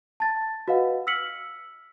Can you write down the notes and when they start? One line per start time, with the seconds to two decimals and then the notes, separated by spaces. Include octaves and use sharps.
0.20 A5 A6
0.68 F#4 B4 D#5 F5 F#5
1.07 E6 F6 B6 C#7 F#7